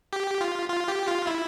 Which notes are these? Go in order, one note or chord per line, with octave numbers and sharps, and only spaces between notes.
G4
F4
F4
G4
F4
E4